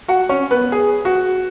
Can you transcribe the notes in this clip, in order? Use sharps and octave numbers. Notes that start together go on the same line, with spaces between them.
F#4 F#5
C#4 C#5
B3 B4
G#4
F#4